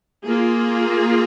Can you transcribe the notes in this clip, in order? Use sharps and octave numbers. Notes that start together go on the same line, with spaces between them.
A#3 F4 G#4